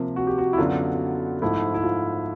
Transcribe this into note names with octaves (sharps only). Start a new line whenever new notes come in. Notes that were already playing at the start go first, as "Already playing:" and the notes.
Already playing: C3 F3 A#3
F#4
G4
F#4
E4
F#2 D3 F#3 B3 D4 F4
G#2 F3 A3 E4
E4
F4